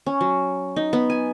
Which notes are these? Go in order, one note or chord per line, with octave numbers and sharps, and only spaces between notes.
C#4
F#3
D#4
B3
G#5